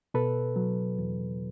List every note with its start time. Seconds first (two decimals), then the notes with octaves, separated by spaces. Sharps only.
0.14 B2 A4 B4
0.56 F#3
0.99 E2